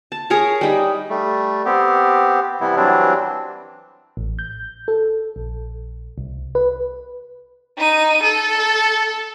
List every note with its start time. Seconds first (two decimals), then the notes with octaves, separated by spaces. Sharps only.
0.12 A5
0.30 G#4 A#4 C#5 A#5
0.61 G3 D#4 B5
1.09 G3 A3
1.66 B3 C4 G4
2.61 C3 E3 G3 B3 E4
2.76 E3 F#3 G3 C4 D4
4.17 A1
4.39 G6
4.88 A4
5.36 A#1
6.18 C2
6.55 B4
7.78 D#4 D#7
8.23 A4